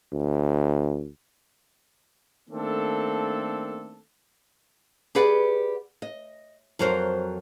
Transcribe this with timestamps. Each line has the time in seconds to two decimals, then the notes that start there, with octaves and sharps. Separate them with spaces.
0.13 D2
2.50 D#3 A3 A#3 C4 D4 A4
5.15 G4 G#4 B4 D5 F#5
6.02 D#5
6.79 F2 F#3 F#4 A#4 C5